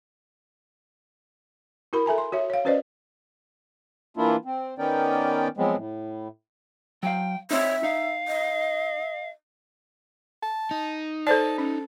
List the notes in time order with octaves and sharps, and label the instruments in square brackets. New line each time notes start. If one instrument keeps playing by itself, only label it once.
[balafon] E4 F#4 A#4 B5
A4 E5 G#5 A#5
C6
F#4 C#5 E5
C#5 F5
C#4 F#4 B4 C5 D5 D#5
[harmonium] E3 A#3 D4 E4 F4
C4
D#3 B3 C#4 A#4 D5 G5
F3 F#3 G#3 B3 C4
A2
[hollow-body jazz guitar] F#3 F5 [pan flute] G5
[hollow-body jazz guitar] C4 D#4 [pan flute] C#5 [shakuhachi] E5
[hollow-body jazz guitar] D#4 [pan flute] F5
[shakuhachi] D#5
[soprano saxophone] A5
[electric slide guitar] D#4
[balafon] A4 C5 D5 [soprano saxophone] A5
[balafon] C#4 [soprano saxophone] A4